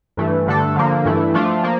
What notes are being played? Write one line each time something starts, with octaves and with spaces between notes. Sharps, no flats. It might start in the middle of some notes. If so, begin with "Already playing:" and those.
G2 E3 A3
G2 D3 A3 D4 A4
D3 F3 A#3
G2 E3 A3 E4
F3 A3 D4 F4
F3 A#3